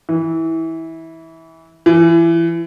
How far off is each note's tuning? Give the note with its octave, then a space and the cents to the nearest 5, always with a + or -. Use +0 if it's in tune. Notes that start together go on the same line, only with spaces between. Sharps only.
E3 -20
E3 +25